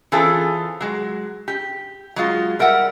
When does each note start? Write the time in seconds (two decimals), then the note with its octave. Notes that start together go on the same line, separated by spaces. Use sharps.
0.12 E3 C4 C#4 F4 G#4 A4
0.81 F#3 G#3
1.48 G4
2.16 F#3 G#3 F4
2.59 G3 A#4 E5 F#5